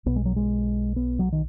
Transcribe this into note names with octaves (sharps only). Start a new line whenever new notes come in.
B1 B2 B3
G#3
F#3
G#3
B3
F#3
D#3